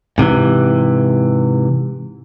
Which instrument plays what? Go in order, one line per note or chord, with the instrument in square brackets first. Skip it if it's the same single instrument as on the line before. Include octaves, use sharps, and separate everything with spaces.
[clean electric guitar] G#2 C3 D#3 E3